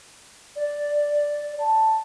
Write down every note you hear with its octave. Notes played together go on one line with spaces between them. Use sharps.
D5
A5